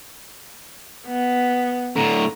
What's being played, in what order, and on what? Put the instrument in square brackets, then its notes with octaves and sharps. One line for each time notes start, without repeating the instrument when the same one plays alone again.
[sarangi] B3
[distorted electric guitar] A2 D3 [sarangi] A#5